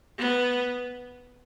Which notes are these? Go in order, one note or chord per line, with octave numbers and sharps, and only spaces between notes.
B3